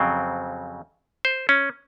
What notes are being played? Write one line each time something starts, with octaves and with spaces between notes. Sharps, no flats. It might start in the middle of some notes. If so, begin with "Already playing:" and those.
Already playing: F2 C#3 F#3 C4
C5
C#4